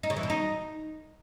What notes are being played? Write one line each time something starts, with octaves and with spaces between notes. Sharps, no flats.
D#4
C#3
E3
B2
D#4